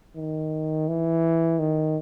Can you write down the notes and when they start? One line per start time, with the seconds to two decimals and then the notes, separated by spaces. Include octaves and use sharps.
0.16 D#3
0.88 E3
1.59 D#3